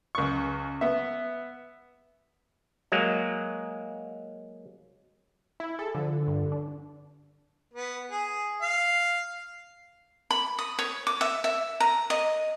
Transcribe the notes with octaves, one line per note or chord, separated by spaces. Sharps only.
C#2 C#6
B3 E5
F#3 G#3 A#3
E4
G#4 A4
D3 F3
G2
D4
B3
G#4
F5
B5
D#6
C#5
D6
E5
E5
A#5
D#5